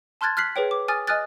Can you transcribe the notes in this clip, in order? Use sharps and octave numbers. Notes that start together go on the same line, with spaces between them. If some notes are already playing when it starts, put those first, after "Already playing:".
A5 C6 F6 F#6 G#6 A6
F6 F#6 B6 C7 F#7
G#4 B4 C#5 G5
D6
G#5 D#6 F6 A6
D#5 G#5 D#6 F6 F#6 A6